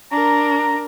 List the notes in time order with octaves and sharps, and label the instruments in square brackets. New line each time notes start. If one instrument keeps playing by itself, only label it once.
[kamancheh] D4 A#4 [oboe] A#5